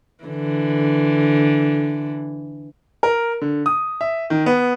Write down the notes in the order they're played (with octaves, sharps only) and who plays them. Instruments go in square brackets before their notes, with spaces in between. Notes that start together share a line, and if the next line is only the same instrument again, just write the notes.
[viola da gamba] D3 E3
[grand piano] A#4
D3
D#6
E5
D#3
B3